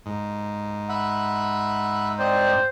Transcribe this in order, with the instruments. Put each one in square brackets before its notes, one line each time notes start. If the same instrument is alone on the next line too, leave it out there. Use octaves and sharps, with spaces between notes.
[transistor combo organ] G#2
[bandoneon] E5 F#5 B5
[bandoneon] C4 D5 D#5 [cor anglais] C5